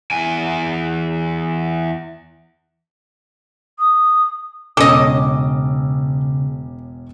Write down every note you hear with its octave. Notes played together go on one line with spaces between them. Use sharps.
E2 G#5
D#6
E1 C#3 C#4 A4 D#5 D6 E6